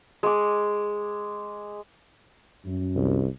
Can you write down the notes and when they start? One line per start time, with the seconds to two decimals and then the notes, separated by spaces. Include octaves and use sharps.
0.23 G#3 D6
2.65 F#2
2.96 C2